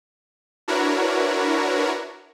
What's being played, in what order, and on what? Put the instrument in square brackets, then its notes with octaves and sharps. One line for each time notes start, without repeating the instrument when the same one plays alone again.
[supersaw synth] D4 E4 F#4 A#4 B4 C#5